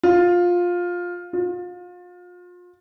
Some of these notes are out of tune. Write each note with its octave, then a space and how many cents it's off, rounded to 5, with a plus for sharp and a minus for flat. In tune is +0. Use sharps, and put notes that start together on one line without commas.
F4 +15
F4 +35